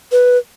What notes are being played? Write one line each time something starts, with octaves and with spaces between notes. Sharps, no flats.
B4